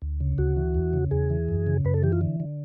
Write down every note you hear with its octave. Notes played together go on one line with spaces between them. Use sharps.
D2
C#3
D2 F#4
E3
E2
C#3
E2 G#4
E3
F#2
C#3
F#2 B4
A4
E3 G4
F4
D3
D3